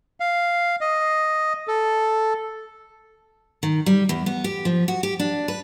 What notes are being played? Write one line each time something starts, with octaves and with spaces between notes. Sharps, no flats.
F5
D#5
A4
D#3
G3
E2
B3
G4
F3
F#4
G4
D4
B4